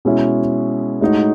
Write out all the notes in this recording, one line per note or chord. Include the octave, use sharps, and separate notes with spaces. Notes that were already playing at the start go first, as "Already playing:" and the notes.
B2 G#3 C#4 E4 G#4
A2 G#3 D#4 F#4